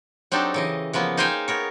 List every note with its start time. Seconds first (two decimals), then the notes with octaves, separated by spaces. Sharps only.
0.32 F#3 C4 D4 D#4 G4 A4
0.54 C#3 E3 D#5
0.93 C#3 F3 A#3 B3
1.17 D#4 G#4 C5 F5 G5 G#5
1.48 B3 A#4 C#5